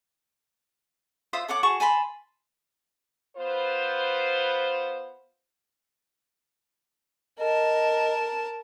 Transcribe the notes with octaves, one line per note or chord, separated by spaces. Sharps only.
F4 C5 E5 D#6
A4 C#5 F#5 D6
F#4 G#4 A5 C#6
G#5 A5 B5 C6
B3 F4 B4 C5
A#4 D#5 A5